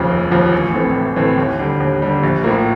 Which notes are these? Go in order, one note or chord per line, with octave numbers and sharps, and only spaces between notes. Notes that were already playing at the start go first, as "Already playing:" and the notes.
Already playing: F1 D#2 C#3 F3
F1
D#2 C#3 F3
A1
A2 E3 A3 C4
A1
A2 E3 A3 C4
D#2
D3 G3
D#2
D3 G3
A#1
A2 F3 A#3